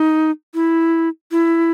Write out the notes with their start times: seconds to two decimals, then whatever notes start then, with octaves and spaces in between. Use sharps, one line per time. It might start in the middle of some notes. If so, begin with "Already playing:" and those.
Already playing: D#4
0.55 E4
1.32 E4